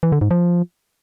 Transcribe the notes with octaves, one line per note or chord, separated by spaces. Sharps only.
E3
D3
G#2
F3